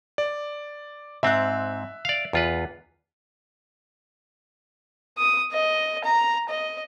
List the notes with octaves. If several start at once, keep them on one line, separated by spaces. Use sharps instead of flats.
D5
G#2 C4 E5 F#6
D5 F5
E2 F4 B4
D#6
D#5
A#5
D#5